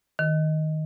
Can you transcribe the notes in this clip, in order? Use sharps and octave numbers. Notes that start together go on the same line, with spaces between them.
D#3